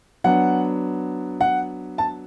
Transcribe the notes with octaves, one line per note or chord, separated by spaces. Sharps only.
F#3 B3 D4 F#5
F#5
A5